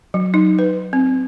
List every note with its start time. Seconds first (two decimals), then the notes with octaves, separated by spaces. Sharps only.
0.14 F#3
0.34 D#4
0.59 B4
0.93 C4